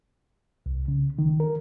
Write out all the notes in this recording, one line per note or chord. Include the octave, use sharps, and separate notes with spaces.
C2
C#3
D#3
A#4